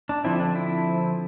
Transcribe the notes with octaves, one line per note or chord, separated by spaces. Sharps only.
D4
D3 F3 C4 E4
D4
E4